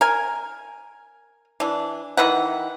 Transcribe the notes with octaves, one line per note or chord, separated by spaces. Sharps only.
A#4 G#5
E3 D4
D#3 E3 B4 F#5